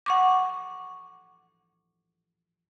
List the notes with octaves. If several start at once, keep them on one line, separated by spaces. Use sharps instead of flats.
F#5 C#6 D6